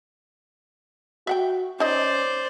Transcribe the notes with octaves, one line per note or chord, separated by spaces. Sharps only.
F#4 E5 F#5 G5
C#4 D#4 C5 D5 D#5